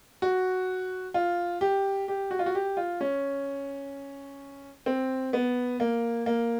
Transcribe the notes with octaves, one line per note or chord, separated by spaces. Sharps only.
F#4
F4
G4
G4
F#4
F4
F#4
G4
F4
C#4
C4
B3
A#3
A#3